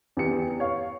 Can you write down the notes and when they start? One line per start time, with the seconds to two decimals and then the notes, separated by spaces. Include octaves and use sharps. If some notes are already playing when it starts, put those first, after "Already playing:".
0.17 E2 G4 C#7
0.60 C#5 F5